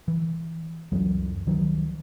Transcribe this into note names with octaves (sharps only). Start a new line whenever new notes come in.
E3
C#2 F#2 E3 F#3
C#2 D#3 F3 F#3